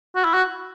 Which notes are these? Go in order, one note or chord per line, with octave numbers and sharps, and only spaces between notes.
F#4
E4
F#4